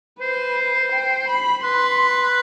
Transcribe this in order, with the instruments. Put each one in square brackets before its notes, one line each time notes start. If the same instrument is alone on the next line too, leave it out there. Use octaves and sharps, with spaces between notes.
[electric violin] B4 [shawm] C5
[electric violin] G5
B5
[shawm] B4 [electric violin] C6